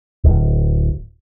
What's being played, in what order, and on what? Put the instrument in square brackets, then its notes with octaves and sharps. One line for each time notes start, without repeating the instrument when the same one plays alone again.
[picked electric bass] D1